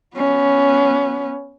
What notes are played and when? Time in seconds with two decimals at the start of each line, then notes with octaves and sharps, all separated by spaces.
0.16 B3 C#4